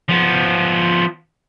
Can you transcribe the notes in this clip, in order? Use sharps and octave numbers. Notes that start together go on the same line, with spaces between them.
F3 B3